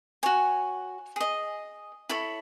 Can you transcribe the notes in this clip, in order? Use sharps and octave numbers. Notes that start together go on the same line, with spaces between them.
F#4 C#5 G#5
G#4 D#5
E4 A4 C#5 B5